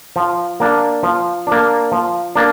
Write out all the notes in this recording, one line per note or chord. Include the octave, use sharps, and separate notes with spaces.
F3
A#3 D4
F3
A#3 D4
F3
A#3 D4